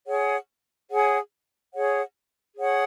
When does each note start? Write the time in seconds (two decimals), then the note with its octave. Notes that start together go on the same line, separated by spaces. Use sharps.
0.07 G#4 C#5 F#5
0.90 G#4 C#5 F#5
1.73 G#4 C#5 F#5
2.56 G#4 C#5 F#5